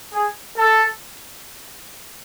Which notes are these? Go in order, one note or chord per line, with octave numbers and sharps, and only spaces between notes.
G#4
A4